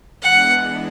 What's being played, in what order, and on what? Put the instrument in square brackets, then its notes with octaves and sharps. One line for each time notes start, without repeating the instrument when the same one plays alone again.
[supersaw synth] E3 G#3 B3 D4 [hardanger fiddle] F#5